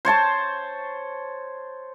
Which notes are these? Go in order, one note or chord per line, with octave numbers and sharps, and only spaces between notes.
C5 C#5 A5 C#6